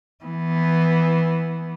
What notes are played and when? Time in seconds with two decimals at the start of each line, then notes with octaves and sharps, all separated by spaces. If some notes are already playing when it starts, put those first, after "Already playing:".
0.25 E3 B3